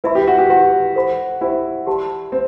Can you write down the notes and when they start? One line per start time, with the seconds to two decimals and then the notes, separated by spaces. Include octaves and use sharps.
0.04 E4 B4 E5 B5
0.15 G4
0.28 F#4
0.38 G4
0.49 E4 F#4 G4 B4
0.95 A4 C5 F#5 B5
1.41 E4 G4 C5 G5
1.87 G4 D5 A5 C6
2.32 C4